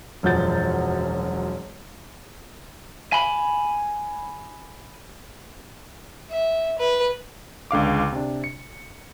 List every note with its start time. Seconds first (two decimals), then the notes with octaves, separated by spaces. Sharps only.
0.23 E1 F#2 F3 F#5 G6 A6
3.13 G#5 B5
6.30 E5
6.78 B4
7.71 C#2 D3 F5 D6
8.12 C3 D4
8.44 C#7